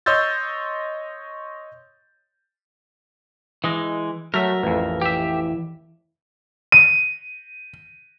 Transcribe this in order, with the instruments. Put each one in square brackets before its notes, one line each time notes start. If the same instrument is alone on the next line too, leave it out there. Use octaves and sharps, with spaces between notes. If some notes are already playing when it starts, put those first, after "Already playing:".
[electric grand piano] C#5 D#5 C6 E6 G6 A6
[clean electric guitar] E3 G#3 [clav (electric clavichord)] D#5
[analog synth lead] F#3 [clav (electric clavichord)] A3 [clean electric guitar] A#4 E5
[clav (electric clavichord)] A1 F2 [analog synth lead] E3
[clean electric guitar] G4 E5
[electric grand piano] D#7